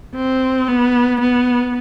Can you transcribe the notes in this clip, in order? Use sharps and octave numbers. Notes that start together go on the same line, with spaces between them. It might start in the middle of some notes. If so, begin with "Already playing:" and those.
C4
B3
B3